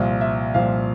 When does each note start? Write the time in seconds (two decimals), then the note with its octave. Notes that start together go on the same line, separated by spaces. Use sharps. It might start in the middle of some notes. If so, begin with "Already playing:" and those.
Already playing: C2 A#2 F3
0.21 E5
0.54 C2 A#2 F3 F5